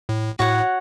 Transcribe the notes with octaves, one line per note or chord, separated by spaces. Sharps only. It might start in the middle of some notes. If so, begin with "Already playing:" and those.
A2
A2 F#4 C#5 F#5